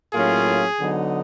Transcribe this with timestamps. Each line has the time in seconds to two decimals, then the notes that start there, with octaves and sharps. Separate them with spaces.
0.13 A2 F#3 A#3 C#4 F4 G#4
0.78 D3 F#3 B3 D#4